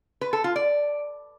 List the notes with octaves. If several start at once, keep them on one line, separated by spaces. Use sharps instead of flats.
B4
A4
F4
D5